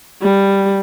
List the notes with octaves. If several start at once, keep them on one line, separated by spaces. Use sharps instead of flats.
G3